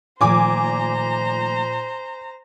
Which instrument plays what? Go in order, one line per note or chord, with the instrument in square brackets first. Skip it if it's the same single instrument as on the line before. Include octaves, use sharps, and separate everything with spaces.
[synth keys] A#2 [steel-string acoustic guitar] D#3 F3 A3 [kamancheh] C5 A#5 [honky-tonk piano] G#5 D6